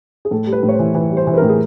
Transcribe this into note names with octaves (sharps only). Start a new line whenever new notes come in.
G#4
A2 A4
G3
B4
A2
C#5
C5
E3
E3 B4
G3
C5
E3
B4
A2 A#4
G#4